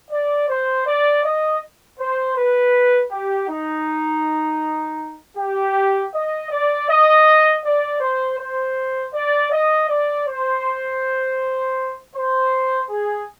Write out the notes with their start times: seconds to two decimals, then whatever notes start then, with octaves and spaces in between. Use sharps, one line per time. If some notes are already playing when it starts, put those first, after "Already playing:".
0.11 D5
0.48 C5
0.86 D5
1.24 D#5
1.99 C5
2.37 B4
3.11 G4
3.49 D#4
5.37 G4
6.13 D#5
6.51 D5
6.88 D#5
7.64 D5
8.00 C5
8.38 C5
9.14 D5
9.51 D#5
9.89 D5
10.27 C5
12.14 C5
12.90 G#4